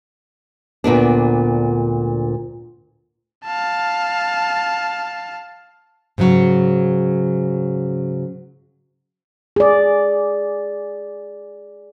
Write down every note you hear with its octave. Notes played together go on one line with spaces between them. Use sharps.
D2 A#2 B3 D4
F5 A5
G#2 C#3 F3 F#3
G#4 D5